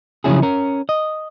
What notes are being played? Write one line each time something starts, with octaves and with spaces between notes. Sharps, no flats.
C#3 F3 F#3 C#4 E4 G#4
C#4 A#4
D#5